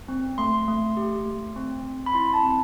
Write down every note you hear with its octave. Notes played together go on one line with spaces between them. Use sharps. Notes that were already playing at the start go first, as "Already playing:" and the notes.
C4
A3 C6
A3
G4
A3
C4
C4
B5
E4 C6
A5
C4